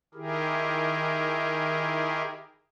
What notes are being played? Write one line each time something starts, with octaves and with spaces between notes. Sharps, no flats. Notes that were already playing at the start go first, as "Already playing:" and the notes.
D#3 E4 G4 G#4 A#4